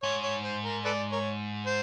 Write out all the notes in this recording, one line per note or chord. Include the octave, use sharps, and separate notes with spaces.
G#2 C#5
C#5
C5
A#4
A4 B4 D5
A#4 C#5
C5